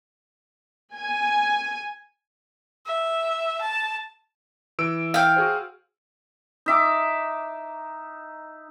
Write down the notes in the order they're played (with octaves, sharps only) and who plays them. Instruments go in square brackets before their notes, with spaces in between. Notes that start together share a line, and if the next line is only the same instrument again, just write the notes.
[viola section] G#5
[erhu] E5
A5
[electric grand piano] E3 E6 D7
[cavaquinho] F5 G5
[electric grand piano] F#4 G#4 C5
[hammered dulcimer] D#4 E5 D6